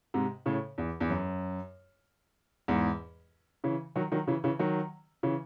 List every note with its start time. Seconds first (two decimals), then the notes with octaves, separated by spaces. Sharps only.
0.14 G#2 C3
0.46 A2 C#3
0.78 E2
1.01 E2
1.10 F#2
2.68 E2 G#2
3.64 C#3 E3
3.96 D#3 F#3
4.12 D#3 F#3
4.27 C#3 E3
4.44 C#3 E3
4.59 D#3 F#3
5.23 C#3 E3